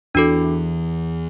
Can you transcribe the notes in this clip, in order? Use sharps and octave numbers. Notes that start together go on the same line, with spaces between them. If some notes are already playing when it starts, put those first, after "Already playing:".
E2 E3 D4 F#4 A4